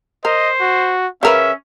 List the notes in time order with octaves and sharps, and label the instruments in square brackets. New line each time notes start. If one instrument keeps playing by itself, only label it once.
[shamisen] A#4 [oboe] C5 [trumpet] D#5
[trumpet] F#4
[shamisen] C#3 A#4 B4 [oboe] C#4 [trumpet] E5